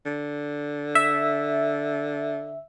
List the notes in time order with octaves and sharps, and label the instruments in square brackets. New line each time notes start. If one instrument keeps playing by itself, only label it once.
[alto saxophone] D3
[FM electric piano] E5